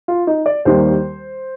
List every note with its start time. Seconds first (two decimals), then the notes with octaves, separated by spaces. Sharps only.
0.08 F4
0.27 D#4
0.46 D5
0.65 D#2 D#3 G3 C5